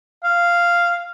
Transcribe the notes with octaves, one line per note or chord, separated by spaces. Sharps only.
F5